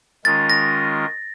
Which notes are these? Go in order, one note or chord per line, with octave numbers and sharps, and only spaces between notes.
D#3 G#3 C#4 F4 A#4 A6
A#6